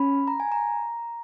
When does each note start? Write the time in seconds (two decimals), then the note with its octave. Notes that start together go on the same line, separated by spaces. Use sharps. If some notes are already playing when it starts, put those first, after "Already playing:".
Already playing: C#4 B5
0.28 A#5
0.40 G#5
0.52 A#5